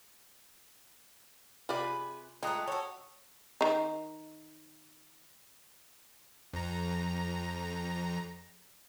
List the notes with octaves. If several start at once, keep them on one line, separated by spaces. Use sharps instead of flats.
C3 F4 G4 G#4 B4 D5 B5
G#3 A3 F4 A4 G5 A#5 D#6 F#6
F#4 A4 C#5
D#3 D#4
F2 A#5